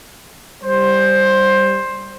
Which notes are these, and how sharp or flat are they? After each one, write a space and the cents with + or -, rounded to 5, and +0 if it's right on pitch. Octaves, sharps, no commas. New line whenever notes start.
G3 +0 C5 +10